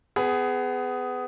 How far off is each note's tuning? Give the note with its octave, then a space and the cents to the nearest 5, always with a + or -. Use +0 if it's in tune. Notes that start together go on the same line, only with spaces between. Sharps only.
B3 +25 G#4 +0